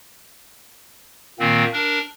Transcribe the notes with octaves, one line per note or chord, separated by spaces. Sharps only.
A#2 D#3 A#3 C4
D4 A#4